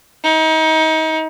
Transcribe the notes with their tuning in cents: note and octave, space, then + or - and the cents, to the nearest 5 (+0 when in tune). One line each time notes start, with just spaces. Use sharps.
D#4 +30